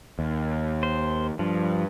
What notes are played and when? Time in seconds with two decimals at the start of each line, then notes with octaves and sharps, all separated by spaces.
0.19 D#2
0.83 C5
1.39 G2 F3